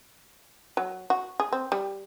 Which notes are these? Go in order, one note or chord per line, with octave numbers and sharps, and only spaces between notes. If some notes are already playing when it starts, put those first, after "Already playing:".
F#3
F#4
G#4
C4
G3